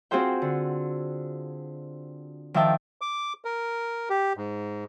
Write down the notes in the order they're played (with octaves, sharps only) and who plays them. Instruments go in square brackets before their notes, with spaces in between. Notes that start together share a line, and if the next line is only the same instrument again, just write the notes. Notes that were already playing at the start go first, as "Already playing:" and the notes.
[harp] C4 F4 F#4 G#4 C5 G5
D3
D#3 F3 D4 E5 G5 A5
[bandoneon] D6
A#4
G4
G#2